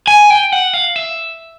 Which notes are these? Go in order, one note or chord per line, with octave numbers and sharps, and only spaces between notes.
G#5
G5
F#5
F5
E5